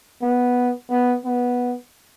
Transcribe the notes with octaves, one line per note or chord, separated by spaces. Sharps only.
B3
B3
B3